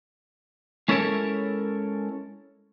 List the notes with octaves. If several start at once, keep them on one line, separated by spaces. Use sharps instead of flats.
G#3 C#4 E4 A4 A#4 C#5